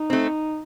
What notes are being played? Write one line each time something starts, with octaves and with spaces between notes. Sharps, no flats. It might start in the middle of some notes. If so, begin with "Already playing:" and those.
Already playing: D#4
A3 C4